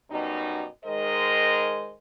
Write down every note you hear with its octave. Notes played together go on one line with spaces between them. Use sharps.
F#2 B2 G3 D#4
D#3 G#3 A#4 C5 D#5